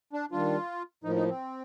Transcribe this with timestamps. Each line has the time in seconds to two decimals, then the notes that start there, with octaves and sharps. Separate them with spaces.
0.13 D4
0.31 D#3 G3 D4 F4
1.04 A2 F3 A#3 D#4
1.16 D#4
1.29 C4